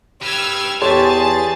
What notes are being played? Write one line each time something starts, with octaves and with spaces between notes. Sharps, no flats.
G4 B4 E6 F6 G#6
E2 G4 G#4 C#5 A5 C6 A6